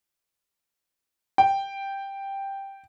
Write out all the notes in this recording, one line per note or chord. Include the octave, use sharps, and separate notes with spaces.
G5